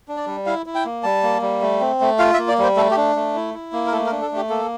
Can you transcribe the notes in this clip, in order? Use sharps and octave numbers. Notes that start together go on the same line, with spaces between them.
D4
D5
G3
E4 F5
E4
G5
A#3
G3 A5
A#3
G3
A3
C4
A3
F4 F5
E5
A#3
D5
G3 C5
A3 A4
G4
D4
A3
E4
E4
A#3
A#4
A3 A4
A#4
D4
A4
A3 G4
A#3 A4